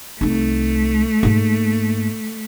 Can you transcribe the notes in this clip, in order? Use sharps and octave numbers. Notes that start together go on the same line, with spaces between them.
C2 A3 D#4
G#2 A#3